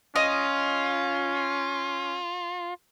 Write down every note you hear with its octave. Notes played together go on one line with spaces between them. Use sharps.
C#4 F4 D#5